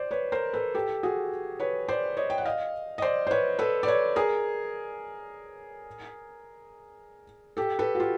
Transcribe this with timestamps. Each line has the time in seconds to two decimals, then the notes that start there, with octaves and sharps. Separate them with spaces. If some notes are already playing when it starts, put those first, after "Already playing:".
Already playing: C5 D5
0.11 B4 C#5
0.32 A#4 C5
0.53 A4 B4
0.75 G4 A4
1.03 F#4 G#4
1.60 B4 C#5
1.88 C5 D5
2.17 C#5 D#5
2.30 G5
2.38 F#5
2.45 D#5 F5
2.98 D#5
3.02 C5 D5
3.27 C5
3.31 B4 C#5
3.59 A4 B4
3.83 D5
3.87 B4 C#5
4.16 G#4 A#4
7.57 G4 A4
7.79 A4 B4
7.95 F#4
8.00 F4 G4